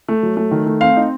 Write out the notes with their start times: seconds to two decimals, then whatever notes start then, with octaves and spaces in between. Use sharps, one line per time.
0.08 A3
0.23 F#3
0.37 A3
0.51 D#3
0.66 A3
0.81 C4 F5
0.96 D#4